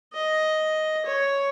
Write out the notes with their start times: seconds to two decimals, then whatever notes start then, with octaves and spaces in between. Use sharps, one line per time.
0.13 D#5
1.05 C#5